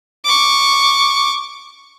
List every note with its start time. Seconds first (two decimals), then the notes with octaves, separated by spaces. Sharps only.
0.25 C#6 D6